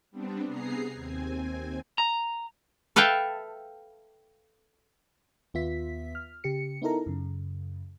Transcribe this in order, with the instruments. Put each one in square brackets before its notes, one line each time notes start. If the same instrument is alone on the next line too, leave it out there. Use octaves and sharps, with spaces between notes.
[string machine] G3 B3 C4 D4
C3 B3 G#4 A#5 C7
D#2 C4 G#5
[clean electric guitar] A#5
[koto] A4 B4 E5 F5 G5 A5
[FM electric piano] D#2 B3 F4 E5 B6
F6
C#3 G4 C#7
B3 D#4 E4 A4 A#4 A#5
F#2 C#3